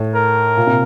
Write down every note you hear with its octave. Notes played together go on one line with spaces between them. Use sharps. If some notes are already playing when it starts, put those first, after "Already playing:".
Already playing: A2
A#4
A#2
C3